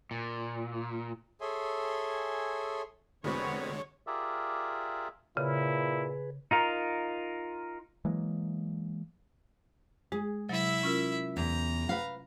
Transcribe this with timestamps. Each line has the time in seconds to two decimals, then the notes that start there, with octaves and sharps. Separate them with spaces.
0.11 A#2
1.41 G#4 A4 C#5 E5 G#5 C6
3.24 F1 D3 G#3 B3 C4 F#4 C#5 B5
4.07 F4 G4 G#4 A#4 D5 E5
5.37 A#2 C#3 E4 G#4 B4
6.51 D#4 F4 A#4
8.05 E3 F#3 G#3 A#3
10.12 G#3 G#4
10.49 C3 F#3 E4 E5
10.83 C#4 F4 A#4
11.37 E2 A#5
11.89 B4 F5